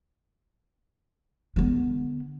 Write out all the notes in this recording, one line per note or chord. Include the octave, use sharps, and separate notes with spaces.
D3 B3